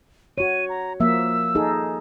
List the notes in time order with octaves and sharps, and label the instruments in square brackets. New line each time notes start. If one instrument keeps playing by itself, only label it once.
[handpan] F#4 C#5 [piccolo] D#7
[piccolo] A#5
[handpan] F3 A#3 E5 [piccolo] E6
[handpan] D#4 G#4 A4